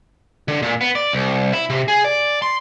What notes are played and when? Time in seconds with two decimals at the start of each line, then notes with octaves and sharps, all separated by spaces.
0.48 D3
0.62 A#2
0.81 B3
0.95 D5
1.13 C2
1.53 E4
1.70 C3
1.88 G#4
2.04 D5
2.42 C6